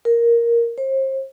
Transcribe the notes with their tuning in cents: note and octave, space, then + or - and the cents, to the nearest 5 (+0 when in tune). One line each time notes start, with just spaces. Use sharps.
A#4 +5
C5 +35